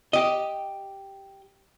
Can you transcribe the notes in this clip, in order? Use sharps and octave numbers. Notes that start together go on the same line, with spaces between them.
G4 D#5